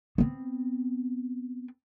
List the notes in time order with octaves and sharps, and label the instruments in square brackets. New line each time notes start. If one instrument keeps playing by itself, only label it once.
[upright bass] B3 C4